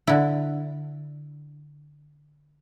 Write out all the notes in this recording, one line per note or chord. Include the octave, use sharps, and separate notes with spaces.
D3 E4